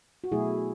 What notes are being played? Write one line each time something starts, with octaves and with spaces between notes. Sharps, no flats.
F#4
B2 F#3 A3 E4 G#4